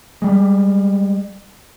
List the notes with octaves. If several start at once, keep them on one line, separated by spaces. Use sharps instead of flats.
G3 G#3